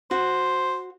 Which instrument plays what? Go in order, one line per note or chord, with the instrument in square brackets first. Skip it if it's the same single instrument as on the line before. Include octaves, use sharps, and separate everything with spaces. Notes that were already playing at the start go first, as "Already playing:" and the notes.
[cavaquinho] F#4 [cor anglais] C5